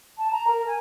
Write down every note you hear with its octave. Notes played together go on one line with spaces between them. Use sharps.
A5
A#5
A#4
G#5